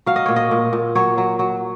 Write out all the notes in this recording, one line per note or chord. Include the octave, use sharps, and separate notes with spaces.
F#3 F5
D#5
A#2 C#5
D#5
A#2
A#2
F#3 C#5
F#3
F#3